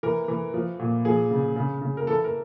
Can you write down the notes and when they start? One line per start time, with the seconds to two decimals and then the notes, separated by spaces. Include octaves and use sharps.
0.03 E3 A#4
0.28 E3
0.54 F3
0.79 A#2
1.05 F3 G#4
1.31 C#3
1.56 C#3
1.82 C#3
1.97 A#4
2.07 E3 A4
2.24 A#4